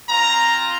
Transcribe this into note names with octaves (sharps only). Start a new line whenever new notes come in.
C4 F4 A#5